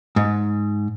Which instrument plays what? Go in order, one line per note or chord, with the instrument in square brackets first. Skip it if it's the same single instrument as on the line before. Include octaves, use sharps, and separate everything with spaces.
[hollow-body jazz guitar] G#2